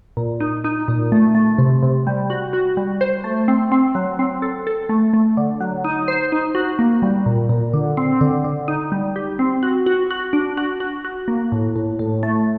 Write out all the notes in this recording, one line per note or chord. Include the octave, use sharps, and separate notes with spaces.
A#2
D#4
D#4
A#2
A3
A3
C3
C3
G3
F#4
F#4
G3
C5
A3
C4
C4
F#3
C4
A4
A4
A3
A3
D3
F#3
D#4
C5
D#4
F#4
A#3
G3
A#2
A#2
D3
C4
D3
D3
D#4
G3
G4
C4
F#4
F#4
F#4
D4
F#4
F#4
F#4
A#3
A2
A2
A2
A3